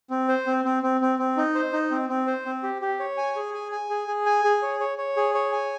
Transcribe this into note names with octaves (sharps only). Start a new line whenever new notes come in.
C4
C5
C4
C4
C4
C4
C4
D#4
C5
D#4
C4
C4
C5
C4
G4
G4
C#5
G#5
G#4
G#5
G#5
G#4
G#4
G#5
G#4
C#5
C#5
C#5
G#4
C#5
G#5